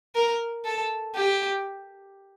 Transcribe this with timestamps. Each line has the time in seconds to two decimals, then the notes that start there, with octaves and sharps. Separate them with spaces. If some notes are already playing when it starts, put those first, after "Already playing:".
0.15 A#4
0.65 A4
1.15 G4